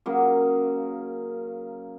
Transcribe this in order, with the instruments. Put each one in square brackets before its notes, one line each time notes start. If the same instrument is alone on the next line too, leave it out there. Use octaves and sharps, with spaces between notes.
[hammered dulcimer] C#3 F#3 A#3